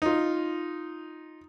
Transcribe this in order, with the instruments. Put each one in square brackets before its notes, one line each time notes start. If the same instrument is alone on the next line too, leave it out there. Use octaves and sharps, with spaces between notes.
[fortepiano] D#4 F4